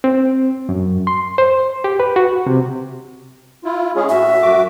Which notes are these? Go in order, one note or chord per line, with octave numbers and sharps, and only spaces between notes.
C4
F#2
C6
C5
G4
B4
F#4
C3
E4 F4
G#3 C#4 G#4
A2 F#4 E5
F#2 F#4 D6